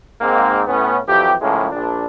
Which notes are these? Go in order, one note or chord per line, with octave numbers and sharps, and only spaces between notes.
G#2 A#3 C4
A2 B3 C#4
F2 E3 F#3 G4
A2 C#3 F3 G#3 A#3 C#4
A#1 D4